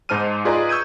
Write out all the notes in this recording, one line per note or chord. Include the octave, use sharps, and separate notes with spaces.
G#2 D#4 C5 A5 F6 D#7
F4 G#4 B4 D5 D#5 A#5
C#6 E6 G6 G#6 D#7